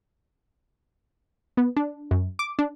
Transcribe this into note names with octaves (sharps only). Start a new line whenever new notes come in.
B3
D4
F#2
D6
D4